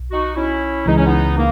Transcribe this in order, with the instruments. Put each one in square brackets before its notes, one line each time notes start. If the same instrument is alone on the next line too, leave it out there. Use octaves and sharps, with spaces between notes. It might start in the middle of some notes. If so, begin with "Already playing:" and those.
Already playing: [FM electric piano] B1
[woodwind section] D#4 F#4
C#4 E4
[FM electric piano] C#2 C#3 E3 G#3 [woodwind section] D#4
[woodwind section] C#4
B3 D#4
A#3